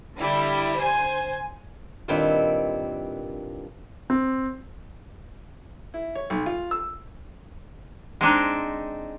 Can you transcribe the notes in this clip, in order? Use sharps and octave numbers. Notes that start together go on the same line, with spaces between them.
D3 G3 E4
C5 G#5
G2 A#2 D#3 C4 E4
C4
E4
C#5
B1
F4
E6
G#3 C4 D4 D#4